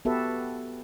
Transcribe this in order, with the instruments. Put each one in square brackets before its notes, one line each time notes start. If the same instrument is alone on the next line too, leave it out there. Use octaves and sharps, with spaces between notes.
[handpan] B3 F#4 G4 A4 B4 E5